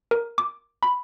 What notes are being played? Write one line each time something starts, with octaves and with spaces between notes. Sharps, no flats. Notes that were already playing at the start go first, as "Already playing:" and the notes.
A#4
D6
B5